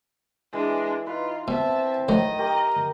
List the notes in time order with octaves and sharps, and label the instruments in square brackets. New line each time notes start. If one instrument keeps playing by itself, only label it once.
[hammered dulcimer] E3 [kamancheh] G#3 D4
[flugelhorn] D#4 [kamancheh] F4 [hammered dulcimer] B4
[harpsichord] B2 [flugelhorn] C4 [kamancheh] E5 A5
[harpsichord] A1 F#3 C5 [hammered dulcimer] D#3 [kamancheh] D#5
[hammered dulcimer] G4 D6 [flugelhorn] A#4